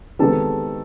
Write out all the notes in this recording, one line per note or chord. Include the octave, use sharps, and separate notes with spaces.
C3 D#3 G#3 B3 A4 A5